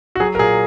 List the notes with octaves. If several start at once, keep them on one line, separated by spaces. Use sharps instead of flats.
F#4
F#3 G#4
A#4
A#2 G#4